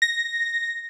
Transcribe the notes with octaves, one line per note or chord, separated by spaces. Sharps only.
A#6